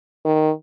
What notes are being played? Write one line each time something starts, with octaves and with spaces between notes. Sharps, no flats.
D#3